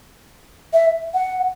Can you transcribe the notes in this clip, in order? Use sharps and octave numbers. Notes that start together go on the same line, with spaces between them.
E5
F#5